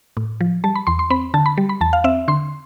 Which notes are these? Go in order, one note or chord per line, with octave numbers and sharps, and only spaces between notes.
A2
F3
G3 A5
B5
E2 C6
C6
C4 B5
D3 A5
B5
G3
B5
E2 A5
F5
C4 E5
D3 C6